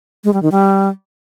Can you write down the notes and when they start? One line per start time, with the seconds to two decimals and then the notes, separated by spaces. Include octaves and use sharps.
0.24 G#3
0.33 G3
0.43 D#3
0.52 G3